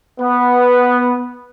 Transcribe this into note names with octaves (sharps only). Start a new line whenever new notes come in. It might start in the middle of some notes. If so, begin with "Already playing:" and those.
B3